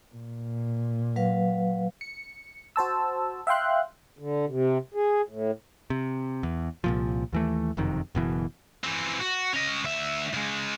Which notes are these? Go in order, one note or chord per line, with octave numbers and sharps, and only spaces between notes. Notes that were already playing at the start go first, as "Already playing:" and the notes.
A#2
F#3 B4 F5
C#7
F#4 C5 A5 E6
E5 F5 G5 C6 F#6
D3
C3
G#4
A2
C3
E2
C2 A#2 F3
D#2 E3 A3
F#1 F2 C3 D#3
F#1 B2 E3
E3 C4
F#4
C#4 D#5
D2 E5
C#3 G#3